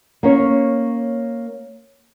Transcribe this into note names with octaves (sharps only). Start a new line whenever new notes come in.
A#3 C#4 C#5